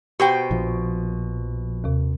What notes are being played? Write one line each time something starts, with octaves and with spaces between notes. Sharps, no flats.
B2 G4 C5 G5
A#1 F3
D#2 C3